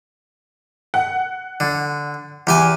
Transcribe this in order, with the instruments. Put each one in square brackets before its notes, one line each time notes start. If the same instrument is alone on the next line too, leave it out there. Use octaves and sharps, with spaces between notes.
[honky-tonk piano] F#5
[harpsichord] D3
E2 G4 G#5